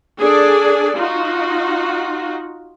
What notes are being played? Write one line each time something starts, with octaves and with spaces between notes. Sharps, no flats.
D4 G#4 A4 D5
D#4 F4 F#4